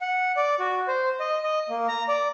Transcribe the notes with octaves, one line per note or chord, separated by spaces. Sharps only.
F#5
D5
F#4
C5
D#5
D#5
A#3
A#5
D5